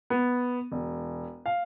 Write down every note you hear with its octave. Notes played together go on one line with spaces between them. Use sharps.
B3
E1
F5